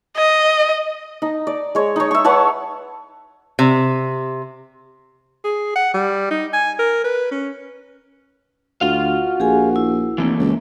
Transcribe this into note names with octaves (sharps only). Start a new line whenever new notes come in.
D#5
D#4
D5
G#3 C#5
D#4 C#5
E5 C#6
B4 C#5 F#5 A5
C3
G#4
F#5
G3
D#4
G#5
A#4
B4
C#4
D2 F4 F#4 F5
A#1 G4 G#4 G#5
E4
F1 E3 A3 A#3
C#2